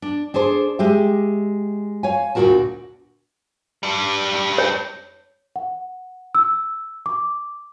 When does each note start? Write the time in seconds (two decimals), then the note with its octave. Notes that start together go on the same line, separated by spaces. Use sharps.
0.02 D4
0.34 D4 G#4 A4 C5
0.79 G#3 G4 E5
2.03 C#5 F5 G#5
2.35 D2 A#2 F3 F#4 A#4 A5
3.83 G3 D4
4.58 C#5
5.56 F#5
6.35 E6
7.06 D6